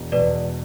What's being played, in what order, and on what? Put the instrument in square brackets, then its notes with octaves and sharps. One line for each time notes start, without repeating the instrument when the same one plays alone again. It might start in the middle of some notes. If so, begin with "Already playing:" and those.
Already playing: [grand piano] E1 E2 B2
[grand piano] E1 E2 B2 [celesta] B4 D5